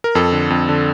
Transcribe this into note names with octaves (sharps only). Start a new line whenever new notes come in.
A#4
F2 A4
D3
F2
D3